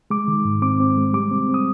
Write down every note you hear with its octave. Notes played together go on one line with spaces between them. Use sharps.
G#3 D6
D#3
G#2
C4 D6
C4
G#3
G3 D6
C4
C4
D#6